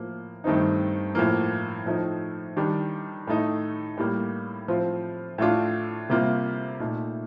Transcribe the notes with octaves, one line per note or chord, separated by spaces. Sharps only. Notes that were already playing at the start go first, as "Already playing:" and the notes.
Already playing: A2 F3 A#3
G2 D#3 A3 C4 D#4
A2 F3 A#3
A2 F3 A3 D#4
D#3 G3 D4
A2 A3 D#4
A2 G3 A#3
A2 F3 C4 F4
A2 A3 D4 F4
C3 G3 A#3 F4
A#2 A3 D#4